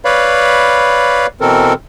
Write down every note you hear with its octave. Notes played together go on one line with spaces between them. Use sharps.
B4 C#5 D5 F5 B5
B2 E3 C4 A4 A#4